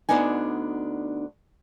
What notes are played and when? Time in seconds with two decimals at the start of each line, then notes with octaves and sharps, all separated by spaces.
0.09 D2 B2 B3 D4 D#4 G#5